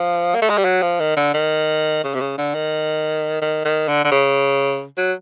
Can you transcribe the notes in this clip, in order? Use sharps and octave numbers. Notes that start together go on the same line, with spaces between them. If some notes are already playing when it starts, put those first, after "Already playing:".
Already playing: F3
A#3
A3
G#3
G3
F#3
F3
D#3
D3
D#3
C#3
C3
C#3
D3
D#3
D#3
D#3
D3
D3
C#3
F#3